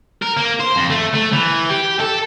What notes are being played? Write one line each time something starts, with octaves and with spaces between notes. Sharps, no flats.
A#4
A#3
C5
F2
A3
A3
E3
G4
A4